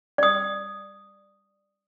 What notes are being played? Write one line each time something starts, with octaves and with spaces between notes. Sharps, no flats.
D5 D#6